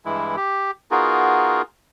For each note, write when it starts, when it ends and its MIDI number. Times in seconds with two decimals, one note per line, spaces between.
0.05 0.36 43
0.05 0.36 52
0.05 0.36 56
0.05 0.36 64
0.37 0.71 67
0.91 1.62 59
0.91 1.62 63
0.91 1.62 65
0.91 1.62 66
0.91 1.62 68
0.91 1.62 70